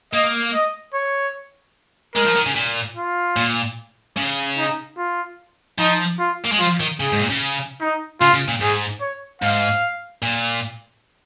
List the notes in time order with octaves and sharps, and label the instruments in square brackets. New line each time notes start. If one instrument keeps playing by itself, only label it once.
[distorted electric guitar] A#3 [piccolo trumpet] D#5
[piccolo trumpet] D#5
C#5
[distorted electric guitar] G#3 [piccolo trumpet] A#4
[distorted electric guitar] F3
D#3
C#3
A#2
[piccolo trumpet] F4
[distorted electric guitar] A#2
C#3
[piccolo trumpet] D#4
F4
[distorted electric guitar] F3 [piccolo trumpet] D#4
[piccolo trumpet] F4
[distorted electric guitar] A#3
G#3
[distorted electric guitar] F3 [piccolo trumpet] F4
[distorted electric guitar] D#3
[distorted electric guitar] C#3 [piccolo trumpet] G#4
[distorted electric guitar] G#2
A#2
C#3
[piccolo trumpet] D#4
[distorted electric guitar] C#3 [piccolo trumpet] F4
[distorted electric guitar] C#3
A#2
[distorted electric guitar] G#2 [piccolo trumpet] G#4
[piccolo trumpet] C#5
[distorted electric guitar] G#2 [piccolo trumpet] F5
[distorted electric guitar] A#2